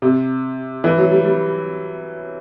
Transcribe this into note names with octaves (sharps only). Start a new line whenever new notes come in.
C3
E3
F#3
G3
G3